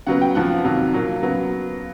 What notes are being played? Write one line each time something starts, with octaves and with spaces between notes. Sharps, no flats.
C#3 F#3 B3 F#5
G5
F2 C#3 F3 F#5
F2 C3 D#3 F#3
A#2 F#3 A#3
C#3 F#3 B3